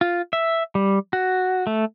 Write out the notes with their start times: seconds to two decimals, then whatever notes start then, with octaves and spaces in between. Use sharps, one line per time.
0.01 F4
0.33 E5
0.75 G3
1.13 F#4
1.67 A3